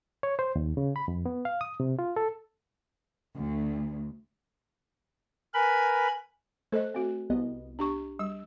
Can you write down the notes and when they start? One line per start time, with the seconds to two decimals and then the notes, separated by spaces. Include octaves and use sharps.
0.23 C#5
0.39 C5
0.56 D#2
0.77 C#3
0.96 B5
1.08 F2
1.26 B3
1.45 F5
1.61 D#6
1.80 C3
1.99 F4
2.16 A4
3.36 D2
5.54 A#4 B4 G#5 B5
6.72 A3 A4 C5 D#5 F#6
6.94 C4 F#4
7.30 C2 B3 D#5
7.79 D4 G4 C#6
8.19 G3 E6